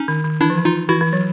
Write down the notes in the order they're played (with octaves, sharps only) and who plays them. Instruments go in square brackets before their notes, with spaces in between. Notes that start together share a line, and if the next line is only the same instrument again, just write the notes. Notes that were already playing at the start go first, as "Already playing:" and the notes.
Already playing: [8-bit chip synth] C#4 D#4
[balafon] D#3
D#3
[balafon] E3 [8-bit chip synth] D4 E4
[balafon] F3
E3
[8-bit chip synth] D#4 F4
[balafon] E3 [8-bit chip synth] E4 F#4
[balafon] E3
F#3